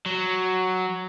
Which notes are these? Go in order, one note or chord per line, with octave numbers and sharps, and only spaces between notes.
F#3